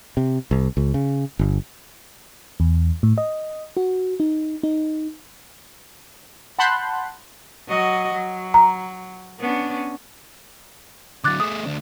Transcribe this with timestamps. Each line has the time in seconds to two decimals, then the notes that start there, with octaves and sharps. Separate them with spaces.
0.17 C3
0.51 C2
0.77 C#2
0.94 C#3
1.39 G1
2.60 E2
3.03 A2
3.18 D#5
3.77 F#4
4.20 D#4
4.63 D#4
6.59 F#5 A5 B5 C6 F#6 G6
7.68 F#3 F#4 D#5
8.13 F#3
8.54 A#5
9.40 B3 C#4 D4
11.24 D3 F#3 D6 F#6 A6
11.40 A3 G#4 D#6
11.66 D2 D4